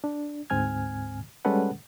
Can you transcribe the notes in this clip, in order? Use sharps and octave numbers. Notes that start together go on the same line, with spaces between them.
D4
D2 G#2 C4 G#5 F6 G#6
G3 G#3 C#4 A4 B4 F#5